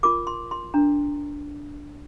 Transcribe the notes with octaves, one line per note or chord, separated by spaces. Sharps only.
F4 A#4 D6
C6
C6
D4 A#4 A#5